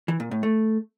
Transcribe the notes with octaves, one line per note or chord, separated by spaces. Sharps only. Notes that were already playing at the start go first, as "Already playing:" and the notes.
E3
A#2
A2
A3